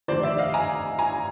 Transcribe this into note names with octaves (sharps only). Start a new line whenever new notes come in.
F1 D#2 D3 C5 D5
D5 E5
D#5 F5
G#5 A#5
G#5 A#5